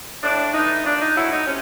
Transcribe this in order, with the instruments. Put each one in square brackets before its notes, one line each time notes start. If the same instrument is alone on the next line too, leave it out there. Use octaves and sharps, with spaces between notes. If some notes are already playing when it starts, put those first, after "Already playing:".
[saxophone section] A2 D4
E3 A3 D#4
A#2 D4
D#4
F#3 A3 E4
D#4
C3 C#4